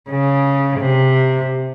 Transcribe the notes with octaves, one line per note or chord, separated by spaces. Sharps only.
C#3
C3